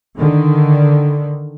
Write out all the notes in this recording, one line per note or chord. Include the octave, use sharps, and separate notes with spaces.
D3 D#3